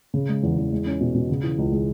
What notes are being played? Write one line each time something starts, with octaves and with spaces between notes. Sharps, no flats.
C#3
G#3
E2
E2
G#3
C#4
B2
B2
C#3
E3
C#2
G#3